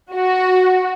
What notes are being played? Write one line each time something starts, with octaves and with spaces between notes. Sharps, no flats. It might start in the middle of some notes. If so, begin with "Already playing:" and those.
F#4